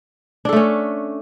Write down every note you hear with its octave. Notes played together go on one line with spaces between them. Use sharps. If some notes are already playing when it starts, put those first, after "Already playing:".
A3 C#4 D4 A4